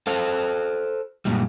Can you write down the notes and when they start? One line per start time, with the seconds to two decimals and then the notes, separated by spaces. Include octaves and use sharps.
0.07 A4 C5 F5
1.25 F#2 A#2 G3